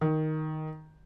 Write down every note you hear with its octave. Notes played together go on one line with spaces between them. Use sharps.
D#3